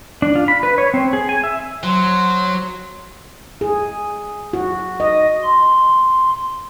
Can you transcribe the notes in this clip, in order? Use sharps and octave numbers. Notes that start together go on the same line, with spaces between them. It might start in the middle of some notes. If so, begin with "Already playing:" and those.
D4
F4
B5
B4
C#5
C4
G#4
G#5
E5
F#3 C5
G#4
F#4
D#5
C6